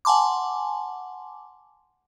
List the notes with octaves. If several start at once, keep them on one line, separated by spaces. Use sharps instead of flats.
F#5 G#5 A5 C6 D6